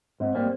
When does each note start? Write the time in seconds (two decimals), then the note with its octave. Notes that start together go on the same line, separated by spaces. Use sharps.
0.20 G#2 C4
0.35 G3 A#3 C4